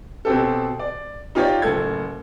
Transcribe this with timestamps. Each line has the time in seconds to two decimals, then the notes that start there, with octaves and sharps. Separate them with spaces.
0.25 B2 C4 G4 A4
0.79 D5
1.35 D#4 F4 G4 C#5 D5
1.62 F#1 A2 A4 G#6